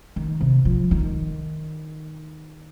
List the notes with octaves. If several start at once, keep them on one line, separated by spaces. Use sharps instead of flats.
D#3
C3
F3
D#3